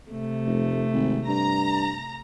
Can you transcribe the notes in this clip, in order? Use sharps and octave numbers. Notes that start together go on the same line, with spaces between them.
C3 A3
F1
G#1
G2 A#5